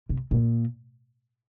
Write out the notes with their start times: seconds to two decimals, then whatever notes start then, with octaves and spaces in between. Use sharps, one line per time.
0.09 C3
0.31 A#2